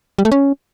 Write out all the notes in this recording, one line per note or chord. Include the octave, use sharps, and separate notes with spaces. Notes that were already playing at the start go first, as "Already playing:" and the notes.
G3
A3
C#4